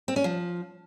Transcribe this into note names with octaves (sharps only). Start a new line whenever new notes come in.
C4
C#4
F3